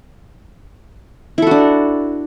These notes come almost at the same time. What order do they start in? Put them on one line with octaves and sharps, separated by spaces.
E4 A4 F#4 D4